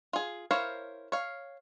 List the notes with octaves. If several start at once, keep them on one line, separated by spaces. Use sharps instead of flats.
F4 G#4
E4 A#4 C5 C#5 F5
C#5 F5